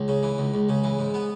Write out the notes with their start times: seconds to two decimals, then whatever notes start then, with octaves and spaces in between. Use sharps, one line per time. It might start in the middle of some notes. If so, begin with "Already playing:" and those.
Already playing: C#2
0.08 C#3
0.23 E3
0.38 C#2
0.54 C#2
0.69 C#3
0.84 E3
0.99 G#2
1.14 B3